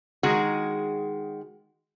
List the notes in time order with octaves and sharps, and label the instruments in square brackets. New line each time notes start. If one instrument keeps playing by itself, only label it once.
[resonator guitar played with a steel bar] D#3 G#3 F#4 G#4